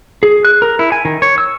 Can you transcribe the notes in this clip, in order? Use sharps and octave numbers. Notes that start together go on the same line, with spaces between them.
G#4
F#6
A#4
E4
G#5
D#3
C#5
E6